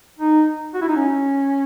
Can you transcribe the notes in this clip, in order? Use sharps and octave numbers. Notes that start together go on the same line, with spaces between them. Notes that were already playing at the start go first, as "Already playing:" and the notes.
D#4
F#4
E4
D#4
C#4